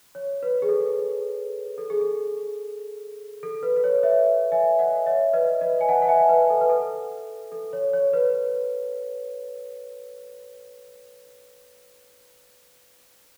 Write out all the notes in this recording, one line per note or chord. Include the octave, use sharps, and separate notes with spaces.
C#5
B4
G#4
A4
A4
G#4
A4
A4
B4
B4
C#5
C#5 E5
E5 G#5
D#5 F#5
C#5 E5
B4 D#5
B4 D#5
G#5
F#5 A5
F#5
E5 G#5
B4
A4
B4
A4
A4
C#5
C#5
B4